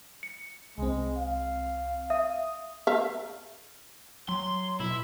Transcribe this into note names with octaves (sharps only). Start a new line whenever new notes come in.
C#7
C2 G#3 C4
F5
E5 D#6
E5 F5
F#3 C6
B2 E4